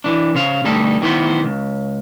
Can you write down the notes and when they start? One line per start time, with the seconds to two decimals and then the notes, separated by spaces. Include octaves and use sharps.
0.04 E3 D4
0.35 C#3 C5 F5
0.64 D2 G2 G3 D#4 A4
1.01 E2 D#3 E3 B3 C5
1.44 C#2